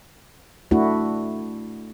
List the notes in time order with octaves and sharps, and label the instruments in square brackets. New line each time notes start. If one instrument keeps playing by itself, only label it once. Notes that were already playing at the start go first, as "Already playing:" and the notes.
[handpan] A3 D4 E4 F#4